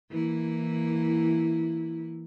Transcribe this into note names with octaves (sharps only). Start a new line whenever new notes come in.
E3 A#3 E4